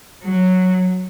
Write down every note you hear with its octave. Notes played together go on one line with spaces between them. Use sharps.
F#3